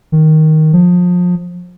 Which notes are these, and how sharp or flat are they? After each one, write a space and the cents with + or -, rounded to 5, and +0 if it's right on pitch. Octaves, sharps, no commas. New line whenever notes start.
D#3 +5
F3 +30